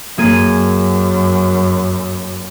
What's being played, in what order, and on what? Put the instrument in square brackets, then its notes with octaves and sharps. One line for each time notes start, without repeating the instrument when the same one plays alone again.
[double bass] F#2 [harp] A#3 G#4 D#7